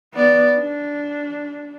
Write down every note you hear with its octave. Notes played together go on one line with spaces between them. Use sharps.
B3 D5
D4